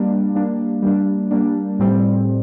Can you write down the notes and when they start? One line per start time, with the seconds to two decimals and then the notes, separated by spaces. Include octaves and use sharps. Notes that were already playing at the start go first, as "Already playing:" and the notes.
Already playing: G3 A#3 D4
0.35 G3 A#3 D4
0.82 G3 A#3 D4
1.31 G3 A#3 D4
1.79 A2 G3 C4